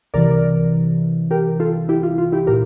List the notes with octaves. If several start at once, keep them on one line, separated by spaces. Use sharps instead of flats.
C2 C3 E3 A#4 D5
G4 A#4
F4 A4
E4 G4
F4
F4
E4 G4
A#2 G4 A#4